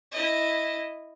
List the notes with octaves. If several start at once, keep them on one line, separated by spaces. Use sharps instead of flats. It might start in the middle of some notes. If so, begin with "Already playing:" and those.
E4 D#5